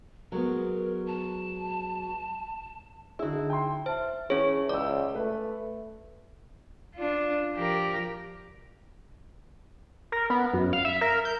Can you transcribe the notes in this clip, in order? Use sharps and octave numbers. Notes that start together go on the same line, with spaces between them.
F#3 G#3 B3 A#4
A5
D3 D#4 E4 F#4 G#4
G5 C6
C5 E5 A5
E3 C#4 G#4 C#5
C#2 D5 D6 E6
A3 B4
D4 F4
F3 G4 A#4
A#4
B3
F#2
F5
E5
A#4
G6